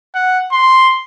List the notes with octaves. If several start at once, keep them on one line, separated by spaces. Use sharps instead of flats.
F#5
C6